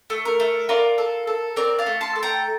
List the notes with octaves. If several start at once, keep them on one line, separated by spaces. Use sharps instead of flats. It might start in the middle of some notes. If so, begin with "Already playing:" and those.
A3
A#4
A3
F4 A#4 D5
A4
A4
C4 A#4 D5
F5 A5
A3
A5 C6
A4
G5 A#5